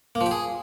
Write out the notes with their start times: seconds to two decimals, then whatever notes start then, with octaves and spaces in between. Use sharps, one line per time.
0.15 A#3
0.21 F3
0.26 G4
0.31 G#4